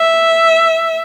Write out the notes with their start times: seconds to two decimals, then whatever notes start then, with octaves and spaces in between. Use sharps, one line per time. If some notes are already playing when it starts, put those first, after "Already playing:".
Already playing: E5